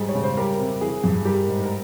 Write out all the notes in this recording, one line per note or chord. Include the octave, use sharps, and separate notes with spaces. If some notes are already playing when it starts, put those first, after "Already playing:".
Already playing: G#2 G3 G#4
C#5
C#3
C5
G3 G4 A#4
C3
E3 G#4
G2
G3 G4 A#4
G#2
A#4